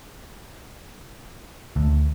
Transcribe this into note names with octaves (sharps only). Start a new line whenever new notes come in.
D2